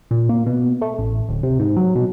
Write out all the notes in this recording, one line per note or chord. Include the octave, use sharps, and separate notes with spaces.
A#2
A#3
B2
A3
A1
D1
C3
G#2
F#3
B2